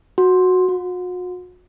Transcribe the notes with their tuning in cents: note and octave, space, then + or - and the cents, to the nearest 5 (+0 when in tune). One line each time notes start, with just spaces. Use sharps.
F#4 -10
F#4 -40